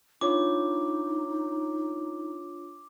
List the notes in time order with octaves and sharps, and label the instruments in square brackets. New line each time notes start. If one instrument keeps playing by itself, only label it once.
[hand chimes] D4 F4 C#5 [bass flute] D#4 [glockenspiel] D6